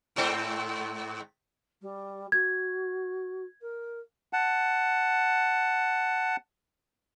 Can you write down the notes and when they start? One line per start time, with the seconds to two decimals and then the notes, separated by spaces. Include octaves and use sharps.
0.16 G#2 A3 C4
1.81 G3
2.32 F#4 G#6
3.61 A#4
4.33 F#5 A5